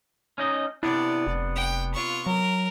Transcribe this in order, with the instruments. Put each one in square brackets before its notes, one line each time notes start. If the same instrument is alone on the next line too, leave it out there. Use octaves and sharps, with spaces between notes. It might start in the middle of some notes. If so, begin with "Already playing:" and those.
[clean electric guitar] C#4 D#4 D#5
[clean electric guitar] C3 B3 D4 [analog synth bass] E4 [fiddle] D5
[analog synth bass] F1
[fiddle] G5
F4 C#6
[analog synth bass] F#3 [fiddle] A#4